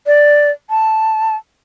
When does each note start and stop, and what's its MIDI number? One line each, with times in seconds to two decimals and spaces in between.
0.07 0.51 74
0.70 1.36 81